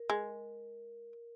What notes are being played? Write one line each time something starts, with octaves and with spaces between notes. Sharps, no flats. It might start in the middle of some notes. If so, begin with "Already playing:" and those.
Already playing: A#4
G#3